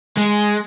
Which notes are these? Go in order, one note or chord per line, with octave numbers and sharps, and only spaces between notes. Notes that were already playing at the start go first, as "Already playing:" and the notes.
G#3